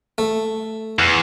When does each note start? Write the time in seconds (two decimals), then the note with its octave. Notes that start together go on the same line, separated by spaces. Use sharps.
0.18 A3
0.99 E2